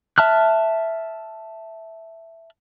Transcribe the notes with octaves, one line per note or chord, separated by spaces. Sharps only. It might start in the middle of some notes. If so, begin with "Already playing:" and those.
E5 A5 F6 F#6